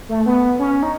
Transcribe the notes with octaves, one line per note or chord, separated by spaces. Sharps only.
A3
B3
C#4
D#4